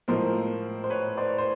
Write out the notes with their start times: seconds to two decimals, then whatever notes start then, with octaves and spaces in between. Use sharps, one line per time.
0.08 A2 F3 G#3 A#4 C5
0.84 C5
0.90 B4 C#5
1.17 C5 D5
1.38 C5